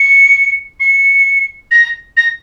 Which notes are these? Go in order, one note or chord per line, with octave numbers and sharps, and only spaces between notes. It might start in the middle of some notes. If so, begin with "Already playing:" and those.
Already playing: C#7
C#7
A#6
A#6